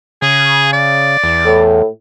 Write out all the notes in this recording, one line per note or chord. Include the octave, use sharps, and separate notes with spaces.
C#3 G#4
D5
E2
A2